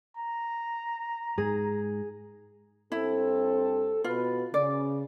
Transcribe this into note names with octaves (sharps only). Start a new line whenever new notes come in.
A#5
G#2 G#4
G2 C4 E4 A4
B2 F4 F#4 B4
C#3 D5